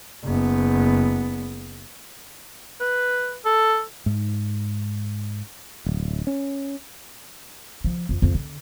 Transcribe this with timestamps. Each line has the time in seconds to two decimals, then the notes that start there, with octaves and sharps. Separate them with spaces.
0.25 F#1 B3
2.81 B4
3.45 A4
4.06 G#2
5.86 D1
6.27 C#4
7.84 F3
8.09 F2
8.22 F2
8.34 D3